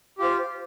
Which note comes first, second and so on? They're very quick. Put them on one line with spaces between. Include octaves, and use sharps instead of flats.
G4 F4 C5